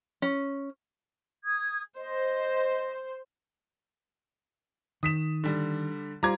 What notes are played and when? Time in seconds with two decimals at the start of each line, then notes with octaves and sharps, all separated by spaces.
0.22 C#4
1.44 D#6 G#6
1.96 C5 D#5
5.03 D#3 D#6 B6 E7
5.44 D3 G3
6.23 G3 F4 C5 A#5 D6 G#6